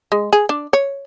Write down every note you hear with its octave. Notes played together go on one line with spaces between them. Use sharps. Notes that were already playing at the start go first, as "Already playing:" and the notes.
G#3
G#4
D4
C#5